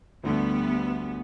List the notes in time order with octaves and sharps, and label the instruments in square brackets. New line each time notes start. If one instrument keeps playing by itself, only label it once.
[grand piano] D2 D3 A3 [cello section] G3 B3